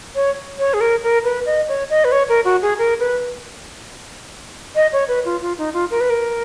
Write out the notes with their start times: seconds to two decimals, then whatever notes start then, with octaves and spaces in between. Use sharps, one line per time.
0.15 C#5
0.59 C#5
0.74 G#4
0.81 A#4
1.03 A#4
1.24 B4
1.46 D#5
1.68 C#5
1.90 D#5
2.04 B4
2.12 C#5
2.29 A#4
2.45 F#4
2.62 G#4
2.78 A#4
2.99 B4
4.75 D#5
4.92 C#5
5.08 B4
5.25 F4
5.41 F4
5.58 D#4
5.74 F4
5.91 A#4
6.00 B4
6.10 A#4